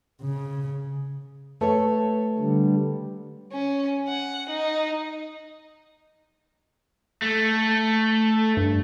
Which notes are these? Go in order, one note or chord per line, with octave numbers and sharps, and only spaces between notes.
C#3
A3 A4 B4 C#5 A5
D3 G3
C#4
F#5
D#4
A3
G2